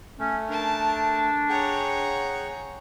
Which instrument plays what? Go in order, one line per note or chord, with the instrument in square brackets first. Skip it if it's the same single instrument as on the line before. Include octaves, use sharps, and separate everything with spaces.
[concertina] A3 [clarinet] C#4
[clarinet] D4 [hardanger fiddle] A#4 A5
[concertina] G#4 F#5 G5 [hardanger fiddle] C#5 A#5